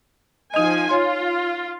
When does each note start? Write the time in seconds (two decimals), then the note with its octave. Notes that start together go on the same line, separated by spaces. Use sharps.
0.54 F3 D#4 D#5 G#5
0.89 F4 C#5 C6